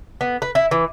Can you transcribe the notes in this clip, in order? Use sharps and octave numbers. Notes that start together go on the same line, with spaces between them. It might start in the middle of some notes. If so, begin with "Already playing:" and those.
B3
B4
E4
E3